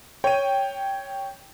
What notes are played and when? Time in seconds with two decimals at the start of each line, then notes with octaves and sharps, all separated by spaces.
0.24 C#5 G5 D#7